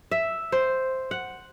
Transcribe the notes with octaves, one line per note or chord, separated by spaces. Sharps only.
E5
C5
F#5